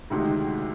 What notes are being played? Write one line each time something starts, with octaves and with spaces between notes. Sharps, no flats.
D2 C3 D#3 G#3 D#4